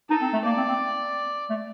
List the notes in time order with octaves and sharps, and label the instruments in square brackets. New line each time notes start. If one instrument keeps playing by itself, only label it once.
[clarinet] D#4 [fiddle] A4
[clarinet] C4
A3
[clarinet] A#3 [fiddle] D5
[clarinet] C4
C4
A3